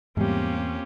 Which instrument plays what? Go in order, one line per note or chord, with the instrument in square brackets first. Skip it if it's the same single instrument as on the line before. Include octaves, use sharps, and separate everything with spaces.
[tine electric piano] E2 [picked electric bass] G#2 G3 [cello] A#3 C4 [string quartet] C#4 F4 G4